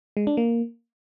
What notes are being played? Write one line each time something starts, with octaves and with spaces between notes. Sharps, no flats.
G#3
D4
A#3